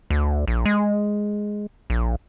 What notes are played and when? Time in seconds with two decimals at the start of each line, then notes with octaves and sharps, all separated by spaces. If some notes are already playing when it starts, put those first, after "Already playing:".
0.10 D2
0.48 A#1
0.65 G#3
1.90 A#1